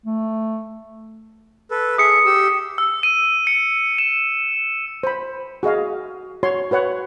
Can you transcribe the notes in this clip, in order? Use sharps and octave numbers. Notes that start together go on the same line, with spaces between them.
A3
A4 B4
G#4 E5 D#6 C#7
G4 E6
E6
D#7
C#7
E7
C5 B5
F#4 G#4 D#5 F5
F#4 C#5 C6
F#4 B4 C#5 F#5